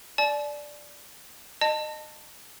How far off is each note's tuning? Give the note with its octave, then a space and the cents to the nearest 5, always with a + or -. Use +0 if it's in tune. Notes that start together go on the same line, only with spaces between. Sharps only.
D5 +0 A5 -45
D#5 -25 A5 +20